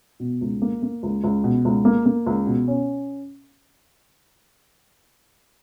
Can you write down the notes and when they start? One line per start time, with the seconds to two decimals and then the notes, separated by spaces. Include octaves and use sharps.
0.20 B2
0.41 C#2
0.62 A#3
0.82 A#3
1.03 C#2
1.24 C#2
1.44 B2
1.65 C#2
1.85 A#3
2.06 A#3
2.26 C#2
2.46 B2
2.68 C#4